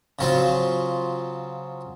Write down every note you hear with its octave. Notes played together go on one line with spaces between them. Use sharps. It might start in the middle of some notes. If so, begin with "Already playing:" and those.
C#3 F#3 C4 F4